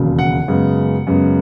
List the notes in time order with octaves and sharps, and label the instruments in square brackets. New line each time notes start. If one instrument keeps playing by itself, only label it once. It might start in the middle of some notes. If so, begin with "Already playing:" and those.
Already playing: [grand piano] E1 D#2 C#3 F#3
F#5
F#2 C#3 G#3 B3
F#2 C#3 G#3 B3